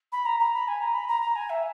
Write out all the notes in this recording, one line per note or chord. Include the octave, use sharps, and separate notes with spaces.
B5
A#5
A#5
B5
G#5
A#5
B5
A#5
A#5
G#5
E5